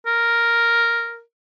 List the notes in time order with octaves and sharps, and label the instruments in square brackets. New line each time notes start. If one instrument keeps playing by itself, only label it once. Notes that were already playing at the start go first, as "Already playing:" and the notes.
[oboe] A#4